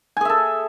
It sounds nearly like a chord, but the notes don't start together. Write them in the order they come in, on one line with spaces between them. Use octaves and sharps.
G#5 G#4 E5 A4